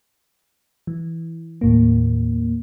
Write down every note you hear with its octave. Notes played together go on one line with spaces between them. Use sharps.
E3
D#2 A2 A#3